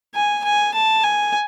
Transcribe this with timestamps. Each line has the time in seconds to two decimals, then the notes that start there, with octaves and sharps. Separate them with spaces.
0.15 G#5
0.45 G#5
0.74 A5
1.04 G#5